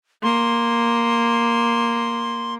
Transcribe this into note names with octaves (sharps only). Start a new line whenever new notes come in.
A#3 C6